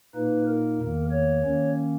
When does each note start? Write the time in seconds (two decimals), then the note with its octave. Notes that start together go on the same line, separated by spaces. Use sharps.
0.15 A#2 A#3 D#4 B4
0.47 A#4
0.79 E2 D#3 A#3
1.11 C#5
1.44 D#3 A#3 C#4